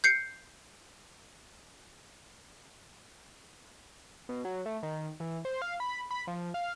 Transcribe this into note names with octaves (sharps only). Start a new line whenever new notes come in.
G6 C7 C#7
B2
F#3
A3
D#3
E3
C5
F5
B5
B5
F3
F5